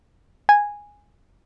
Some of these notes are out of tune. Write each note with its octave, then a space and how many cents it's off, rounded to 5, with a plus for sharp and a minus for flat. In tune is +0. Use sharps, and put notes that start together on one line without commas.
G#5 -10